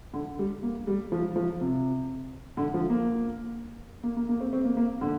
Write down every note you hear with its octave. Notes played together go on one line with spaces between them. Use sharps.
D3
G3
A#3
G3
F3
F3
C3
D3
F3
A#3
A#3
A#3
A#3
C4
C4
A#3
A#3
D3